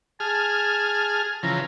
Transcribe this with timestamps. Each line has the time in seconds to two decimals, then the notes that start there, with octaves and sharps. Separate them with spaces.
0.20 G#4 A5 F6
1.43 C#3 E3 F3 A#5